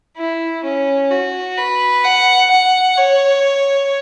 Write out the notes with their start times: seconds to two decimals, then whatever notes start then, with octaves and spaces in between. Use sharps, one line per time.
0.17 E4
0.64 C#4
1.11 F#4
1.58 B4
2.04 F#5
2.50 F#5
2.98 C#5